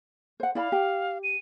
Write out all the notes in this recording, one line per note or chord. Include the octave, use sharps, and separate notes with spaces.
C5 F#5
E4 D5 F5 B5
G4
D#7